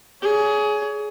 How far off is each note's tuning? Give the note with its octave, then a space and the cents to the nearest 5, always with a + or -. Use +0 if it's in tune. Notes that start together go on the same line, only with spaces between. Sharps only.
G#4 +20 C#5 +35